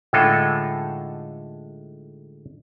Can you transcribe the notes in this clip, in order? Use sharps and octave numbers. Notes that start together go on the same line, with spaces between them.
A2 D3 G#3 D#4 F4 A4